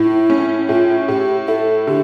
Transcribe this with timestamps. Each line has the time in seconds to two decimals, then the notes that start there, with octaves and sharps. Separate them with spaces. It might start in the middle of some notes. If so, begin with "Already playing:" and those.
Already playing: A2 E4
0.30 C#4
0.69 A2 F4
1.08 A2 G4
1.48 E4 A4
1.87 D3 G4